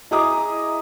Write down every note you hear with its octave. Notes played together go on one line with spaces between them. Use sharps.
E4 G#4 D#5 A#5 D6 D#6